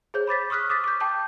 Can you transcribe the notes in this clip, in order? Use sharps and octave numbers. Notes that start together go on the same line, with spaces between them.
G#4 C5 C#5 G6
B5 D6 A6 B6
C#6 D#6 F6 F#6 B6
D6 D#6 A6 B6
D6 G6
G5 A5 D6 G6